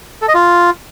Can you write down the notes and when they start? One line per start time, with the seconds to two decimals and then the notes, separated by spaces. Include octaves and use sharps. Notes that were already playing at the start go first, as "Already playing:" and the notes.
0.22 A4
0.28 D#5
0.35 F4